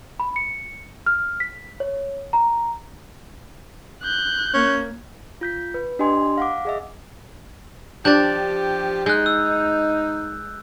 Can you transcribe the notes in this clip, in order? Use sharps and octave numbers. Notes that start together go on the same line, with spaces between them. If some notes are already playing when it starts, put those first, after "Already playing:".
B5
C#7
F6
B6
C#5
A#5
F#6 G6
A#3 C#4
F4 G6 B6
B4
D4 G4 D#5 G#5 C6
F5 F#5 D6
G#4 D#5 E5
F3 D4 G4 D5 G6 A6
G#3 D#4 F#6 G6
E6